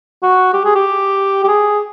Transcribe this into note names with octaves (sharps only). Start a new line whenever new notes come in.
F#4
G4
G#4
G4
G4
G#4